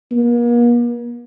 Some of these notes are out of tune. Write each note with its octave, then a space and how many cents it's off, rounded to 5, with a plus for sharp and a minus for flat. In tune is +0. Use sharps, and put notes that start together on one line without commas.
A#3 +40